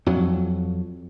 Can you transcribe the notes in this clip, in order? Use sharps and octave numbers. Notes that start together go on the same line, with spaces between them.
F2 F#3